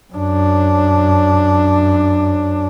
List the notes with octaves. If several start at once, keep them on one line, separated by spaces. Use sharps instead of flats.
F#2 D4